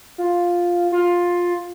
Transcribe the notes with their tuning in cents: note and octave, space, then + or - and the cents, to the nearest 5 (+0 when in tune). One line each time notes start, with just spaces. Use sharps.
F4 +5
F4 +10